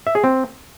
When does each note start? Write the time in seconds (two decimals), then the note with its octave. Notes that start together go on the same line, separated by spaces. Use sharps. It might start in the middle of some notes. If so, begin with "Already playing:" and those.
0.07 E5
0.15 G#4
0.24 C4